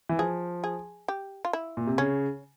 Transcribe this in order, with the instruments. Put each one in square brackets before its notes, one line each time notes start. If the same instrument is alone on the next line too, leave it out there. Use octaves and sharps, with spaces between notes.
[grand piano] E3
[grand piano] F3 [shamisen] G#4
[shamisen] G#4
G4
F4
E4
[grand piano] A#2
C3
[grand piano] C#3 [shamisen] C#4